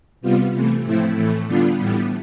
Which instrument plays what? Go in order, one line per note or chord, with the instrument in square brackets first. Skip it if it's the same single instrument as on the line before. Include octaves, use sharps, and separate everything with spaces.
[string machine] C3 G3 B3 F4
C3 E3 A3
A2 F3 A3 C4 E4
A2 E3 A3
D3 G3 B3 D4 F4
A2 E3 G3 B3